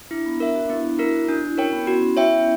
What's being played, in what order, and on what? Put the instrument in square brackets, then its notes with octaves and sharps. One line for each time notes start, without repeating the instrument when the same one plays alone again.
[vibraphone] D4 [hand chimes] E4
[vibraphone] B3
[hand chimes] A#4 E5
[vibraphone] F#4
D4
[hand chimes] B3 [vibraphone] E4
[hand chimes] E4 A#4
[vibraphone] F#4
[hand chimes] D4 [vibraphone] F#4
[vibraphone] E4
[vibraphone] C#4 [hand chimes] A#4 C#5 G5
[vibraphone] B3
[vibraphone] B3 [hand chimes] F#4
[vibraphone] C#4
[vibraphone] E4 [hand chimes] C#5 E5 G5